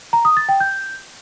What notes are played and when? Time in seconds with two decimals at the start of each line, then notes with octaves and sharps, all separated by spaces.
0.13 A#5
0.25 D#6
0.37 A6
0.49 G5
0.60 G6